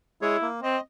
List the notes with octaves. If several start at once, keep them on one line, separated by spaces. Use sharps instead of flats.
G#3 E4 G#4 C#5
A#3
C4 D#5